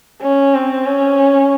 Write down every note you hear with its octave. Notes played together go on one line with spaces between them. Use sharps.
C#4
C4
C#4